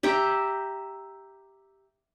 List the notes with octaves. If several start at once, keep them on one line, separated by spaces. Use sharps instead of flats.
G4 E5 G5 A#5